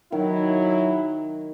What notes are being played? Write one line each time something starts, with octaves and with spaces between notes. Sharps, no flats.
D#3 F#3 E4